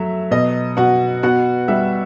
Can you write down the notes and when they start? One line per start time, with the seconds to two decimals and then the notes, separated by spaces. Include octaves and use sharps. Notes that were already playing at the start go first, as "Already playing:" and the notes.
Already playing: F#3 A3 E5
0.31 B2 D#5
0.77 B2 F#4 F#5
1.23 B3 F#4 F#5
1.68 G3 E5